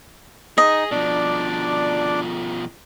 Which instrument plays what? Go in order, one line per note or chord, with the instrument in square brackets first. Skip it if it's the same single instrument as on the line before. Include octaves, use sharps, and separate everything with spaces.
[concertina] D#4 [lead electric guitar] G#4 [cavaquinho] D#5
[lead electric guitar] B2 F3 [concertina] D4 D5